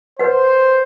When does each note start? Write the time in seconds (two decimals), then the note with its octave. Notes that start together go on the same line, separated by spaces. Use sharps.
0.19 B4 C5 F#5